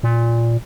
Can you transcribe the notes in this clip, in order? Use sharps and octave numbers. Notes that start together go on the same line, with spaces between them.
A#2